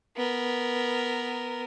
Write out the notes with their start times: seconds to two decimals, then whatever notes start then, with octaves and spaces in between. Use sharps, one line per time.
0.16 B3 A#4